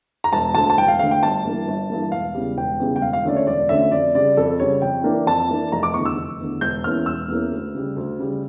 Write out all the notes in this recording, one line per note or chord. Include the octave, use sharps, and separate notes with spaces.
A#5
E1 A5
D2 D3 A5
A5
E1 G5
F5
D2 D3 F5
G5
G1 A5
G2 E3 A#3
G1
G2 E3 A#3
E1 F5
E2 C#3 G3
E1 G5
E2 C#3 G3
G5
E1 F5
F5
D2 D3 A3 C#4 D5
C#5
E1 D5
D2 D3 A3 C#4 E5
F2 D5
C#3 G3 D5
F2 A4
C#3 G3 C#5
F2 G5
E3 A#3 D4
F2 A5
E3 A#3 D4
F1 A#5
D6
E2 D3 C#6
E6
F1
E2 D3
E1 G6
E2 E3 A#3 C#4 F6
E1 E6
E2 E3 A#3 C#4
D2
C#3 G3
D2
C#3 G3